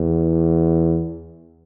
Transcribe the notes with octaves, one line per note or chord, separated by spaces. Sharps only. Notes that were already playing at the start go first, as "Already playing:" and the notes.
Already playing: E2